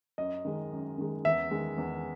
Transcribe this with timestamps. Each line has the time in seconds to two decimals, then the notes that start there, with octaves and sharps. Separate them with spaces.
0.18 F#2 D#5
0.45 D#3 G#3
0.72 F#2
0.98 D#3 G#3
1.25 E2 E5
1.51 D#3 G#3
1.78 E2